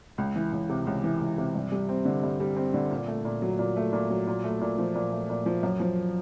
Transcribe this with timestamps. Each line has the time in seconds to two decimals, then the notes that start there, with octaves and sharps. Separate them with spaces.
0.18 C#2
0.36 E3
0.53 C#2
0.69 C3
0.87 C#2
1.04 E3
1.21 C#2
1.38 C3
1.55 G2
1.72 G3
1.89 C4
2.05 D3
2.23 G2
2.40 G3
2.57 C4
2.74 D3
2.91 A#2
3.07 A3
3.25 A#2
3.42 F#3
3.59 A#2
3.76 A3
3.93 A#2
4.10 F#3
4.27 A#2
4.44 A3
4.61 A#2
4.78 F3
4.95 A#2
5.12 A3
5.30 A#2
5.46 F3
5.63 F#2
5.80 F3